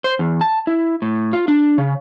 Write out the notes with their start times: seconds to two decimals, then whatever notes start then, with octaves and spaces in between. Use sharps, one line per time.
0.04 C5
0.19 E2
0.41 A5
0.67 E4
1.02 A2
1.33 F4
1.48 D4
1.78 C#3